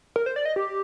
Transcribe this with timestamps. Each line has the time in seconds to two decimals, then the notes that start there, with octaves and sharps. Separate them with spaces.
0.16 A#4
0.26 C5
0.36 D5
0.45 D#5
0.56 G4